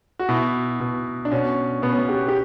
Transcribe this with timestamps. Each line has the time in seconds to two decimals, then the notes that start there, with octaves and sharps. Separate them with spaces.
0.19 F#4
0.29 B2 E4
0.80 B2
1.25 D4
1.32 B2 C#4
1.82 B2 B3
1.92 C#4
1.99 B3
2.09 G4
2.28 G4